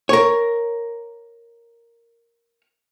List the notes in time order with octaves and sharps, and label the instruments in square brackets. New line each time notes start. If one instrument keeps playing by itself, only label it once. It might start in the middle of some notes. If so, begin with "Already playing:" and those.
[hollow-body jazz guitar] A#4 C#5